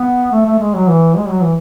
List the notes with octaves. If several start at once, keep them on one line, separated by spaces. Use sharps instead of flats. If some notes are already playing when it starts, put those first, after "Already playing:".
Already playing: B3
A3
A3
G#3
F#3
E3
G#3
F#3
E3